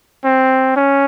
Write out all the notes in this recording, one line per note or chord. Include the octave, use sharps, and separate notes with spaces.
C4
C#4